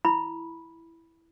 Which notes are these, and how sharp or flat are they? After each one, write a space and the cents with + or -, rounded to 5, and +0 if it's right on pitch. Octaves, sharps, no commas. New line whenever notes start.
E4 +0 B5 -10